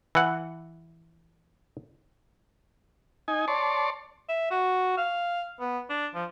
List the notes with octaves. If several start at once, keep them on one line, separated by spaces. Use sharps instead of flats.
E3 F#5
D#4 G#5
C#5 D5 A5 C6
E5
F#4
F5
B3
D4
F3